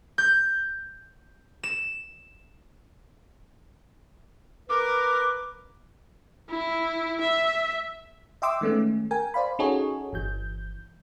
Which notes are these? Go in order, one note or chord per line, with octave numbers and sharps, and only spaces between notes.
G6
E7
A#4 B4 D6
E4
E5
D#5 E5 G5 C6 D6 E6
D#3 G#3 A3 B3 C#4
A#4 G5 G#5
C5 D5 F5 B5
C#4 D#4 F#4 G#4 A4 C#5
G1 E3 G6